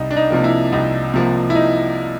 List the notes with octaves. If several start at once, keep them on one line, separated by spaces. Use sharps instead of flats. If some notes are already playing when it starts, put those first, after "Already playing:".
Already playing: C2 D#4
D4
D#4
C3 F3 A#3
E4
C2 D#4
C3 F3 A#3
E4
D#4